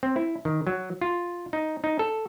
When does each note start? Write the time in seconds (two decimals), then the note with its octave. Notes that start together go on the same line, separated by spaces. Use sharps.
0.03 C4
0.16 E4
0.45 D#3
0.67 F#3
1.01 F4
1.53 D#4
1.84 D#4
1.99 A4